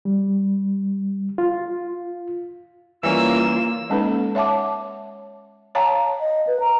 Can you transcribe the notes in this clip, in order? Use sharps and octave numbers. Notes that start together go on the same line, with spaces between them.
G3
F4
E3 G3 A#3 C#4 F4 E6
G#3 A#3 C#4 D#4 A4 B4
C#5 E5 F#5 A5 D6
C#5 F5 G5 A5 A#5
D#5
B4
A#5